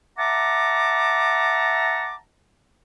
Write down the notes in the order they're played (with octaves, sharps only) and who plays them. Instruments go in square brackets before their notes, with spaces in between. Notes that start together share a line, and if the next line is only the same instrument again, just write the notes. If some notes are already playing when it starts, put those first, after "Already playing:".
[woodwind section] E5 F#5 A5 A#5 D6